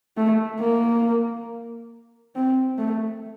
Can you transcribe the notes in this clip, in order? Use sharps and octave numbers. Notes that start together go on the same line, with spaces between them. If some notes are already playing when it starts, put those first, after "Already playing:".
A3
A#3
C4
A3